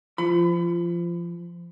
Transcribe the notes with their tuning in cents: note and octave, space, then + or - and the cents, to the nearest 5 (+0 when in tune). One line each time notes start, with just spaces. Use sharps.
F3 -25 B5 +30